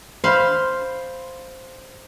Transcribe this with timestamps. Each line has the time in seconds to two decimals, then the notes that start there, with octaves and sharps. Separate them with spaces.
0.24 C5 F5 B5